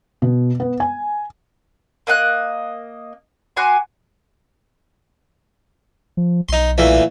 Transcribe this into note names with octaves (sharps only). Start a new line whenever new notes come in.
B2
B3
G#5
A#3 D#5 F#5 F#6
F#4 G#5 C6 D6
F3
B1 D#4 C6
A#2 E3 A3